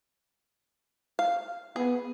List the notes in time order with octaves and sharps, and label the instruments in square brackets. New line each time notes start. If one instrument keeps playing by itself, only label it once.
[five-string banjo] F5
[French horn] B3 [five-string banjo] G#4